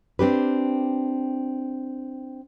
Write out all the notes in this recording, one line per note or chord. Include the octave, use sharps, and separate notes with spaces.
C4 D4 G4 B4